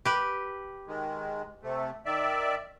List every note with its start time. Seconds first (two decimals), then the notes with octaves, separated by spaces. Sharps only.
0.05 G4 B4
0.87 D#3 G#3
1.63 C3 A3
2.06 D#3 D5 E5